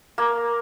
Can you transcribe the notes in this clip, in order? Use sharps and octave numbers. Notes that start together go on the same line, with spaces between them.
A#3